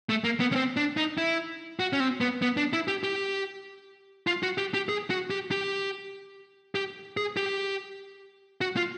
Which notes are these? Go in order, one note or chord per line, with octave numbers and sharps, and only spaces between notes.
A3
A#3
B3
C#4
C4
D4
D#4
E4
F#4
C#4
C4
B3
B3
D4
E4
G4
G4
F4
F#4
G4
G4
G#4
F#4
G4
G4
G4
G#4
G4
F#4
F4